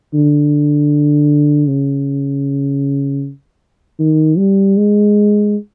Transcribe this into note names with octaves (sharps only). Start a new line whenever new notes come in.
D3
C#3
D#3
G3
G#3